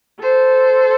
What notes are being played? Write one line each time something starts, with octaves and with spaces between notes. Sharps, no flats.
A4 C5